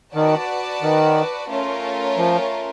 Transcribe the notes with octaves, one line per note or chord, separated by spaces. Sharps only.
D#3 F#4 B4 D5 F#5 A5
D#3
A3 C#4 F4 A#4
F3